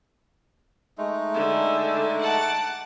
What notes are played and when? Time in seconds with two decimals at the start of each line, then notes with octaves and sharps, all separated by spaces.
0.98 G#3 A3 D#4
1.35 D3
2.21 F#5 A5 D6